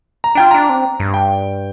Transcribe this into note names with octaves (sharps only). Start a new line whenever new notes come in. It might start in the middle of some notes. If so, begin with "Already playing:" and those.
A#5
D4 F4 G5
D4 A#5
C4
G2
G5